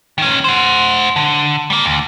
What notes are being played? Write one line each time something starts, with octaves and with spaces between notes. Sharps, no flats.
D#3 C#4
C5 F#5
D3
G3 A#3
D2